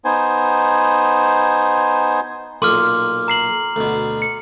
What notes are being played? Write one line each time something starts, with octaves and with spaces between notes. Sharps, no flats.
B3 D#4 C5 G#5
B1 A#2 C6 D6 D#6 F6
A#5 C7 F#7
D2 B2
C#7